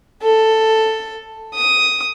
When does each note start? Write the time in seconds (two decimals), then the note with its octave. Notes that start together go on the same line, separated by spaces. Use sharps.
0.22 A4
1.55 D#6